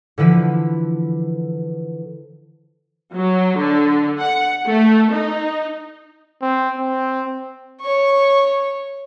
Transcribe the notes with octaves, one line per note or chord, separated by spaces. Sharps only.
D3 E3 F3 B4
F#3
D3
F#5
A3
D#4
C4
C4
C#5 C#6